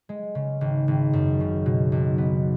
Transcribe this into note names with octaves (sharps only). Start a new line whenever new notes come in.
G#3
C#3
G#1
G#1
F#2
C#3
B2
B1
B3